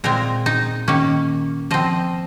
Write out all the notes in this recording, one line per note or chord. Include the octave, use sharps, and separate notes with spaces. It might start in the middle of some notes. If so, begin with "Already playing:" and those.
A#2 G#3 C4 A#4
D#4
D#3 A#3 C#4
F3 C4 D#5